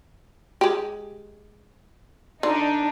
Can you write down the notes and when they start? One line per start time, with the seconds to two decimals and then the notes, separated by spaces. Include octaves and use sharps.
0.61 G#3 G4
2.43 D3 D4 D#4